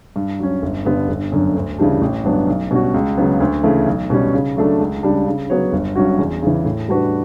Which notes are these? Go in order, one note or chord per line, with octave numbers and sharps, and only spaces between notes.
G2
F#3 C#4
G1
G2 D3 G3 B3
G1
F#2 D3
D2
C#3 E3 G3 D4
A1
G2 F#3 B3 D4
B1
B2 G3 C#4 F#4
C#2
C#3 F#3 B3
D2
C#3 E3 A3
B1
B2 G3 C#4
C#3
F#3 A3 D4 A4
C#2
C#3 G3 D4
C#3
F#3 B3 F#4 C#5
G1
G2 F#3 C#4 F#4
E2
C#3 E3
A2
G3 D4 F#4 B4